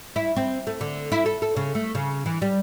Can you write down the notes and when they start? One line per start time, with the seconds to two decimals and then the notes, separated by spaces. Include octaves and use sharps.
0.16 E4
0.36 C4
0.67 A3
0.81 D3
1.12 E4
1.26 A4
1.42 A4
1.56 C#3
1.75 A3
1.95 C#3
2.26 E3
2.42 G3